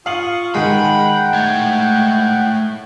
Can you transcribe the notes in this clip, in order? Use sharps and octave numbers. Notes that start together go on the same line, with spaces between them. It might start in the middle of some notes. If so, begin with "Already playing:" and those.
F4 F5 C#6 D#6 F#7
D#3 G#3 F#5 G5 B5
A3 C#5